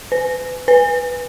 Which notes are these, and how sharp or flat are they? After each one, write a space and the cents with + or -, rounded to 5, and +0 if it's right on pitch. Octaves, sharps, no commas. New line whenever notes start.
B4 +35
B4 +0